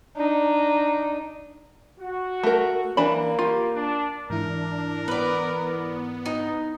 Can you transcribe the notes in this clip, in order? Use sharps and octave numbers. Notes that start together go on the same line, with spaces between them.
D4 D#4
F#4
A3 A#4
E3 A#3 D4 B5
F4 G4
D4
G#2 E3 D4 E4 A#4
B3 B4 D5
D#4